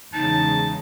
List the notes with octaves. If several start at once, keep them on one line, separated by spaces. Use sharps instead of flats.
E2 C#3 G#3 D#4 A5